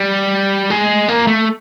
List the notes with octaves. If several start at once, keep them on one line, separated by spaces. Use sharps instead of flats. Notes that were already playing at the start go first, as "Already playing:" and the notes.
Already playing: G3
G#3
A#3
A3